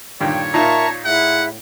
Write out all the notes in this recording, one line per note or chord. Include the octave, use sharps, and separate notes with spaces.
G2 A#2 D#3 C#5 G5
A#2 D#4 F4 A#4 E5 A5 A#5 C#6
A2 E4 G#4 E5 F#5